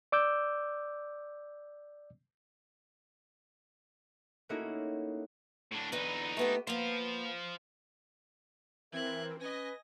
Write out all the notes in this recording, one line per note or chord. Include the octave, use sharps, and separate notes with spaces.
D5 D6 E6 G6
A3 A#3 C#4 D#4 E4 F#4
A2 D4
E2 D3 D#4 B4
A3 B3 G4
A#3 B3 C5 F5
E3 C4 A#4 E5 F#6 G#6
C#4 B4 D#5 G#5 A#6